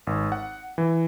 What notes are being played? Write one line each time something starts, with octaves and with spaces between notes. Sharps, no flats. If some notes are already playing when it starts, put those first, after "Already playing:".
G#1
F#5
E3